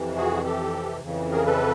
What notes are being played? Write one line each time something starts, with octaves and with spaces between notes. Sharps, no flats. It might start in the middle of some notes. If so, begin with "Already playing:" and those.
Already playing: F2 C3 E3
F#4 G#4
G4 A4
F2 C#3 E3
G#4 A#4
A4 B4